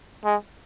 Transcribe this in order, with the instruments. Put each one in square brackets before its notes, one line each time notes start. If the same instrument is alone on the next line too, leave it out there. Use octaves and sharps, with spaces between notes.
[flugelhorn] G#3